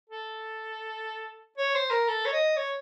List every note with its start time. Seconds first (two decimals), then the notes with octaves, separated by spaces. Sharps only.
0.10 A4
1.58 C#5
1.75 C5
1.91 A#4
2.08 A4
2.25 C#5
2.32 D#5
2.57 C#5